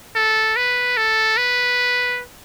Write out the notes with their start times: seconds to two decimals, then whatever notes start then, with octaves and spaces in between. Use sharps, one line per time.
0.16 A4
0.56 B4
0.97 A4
1.37 B4